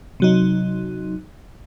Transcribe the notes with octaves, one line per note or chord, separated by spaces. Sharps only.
C3 F#3 D#4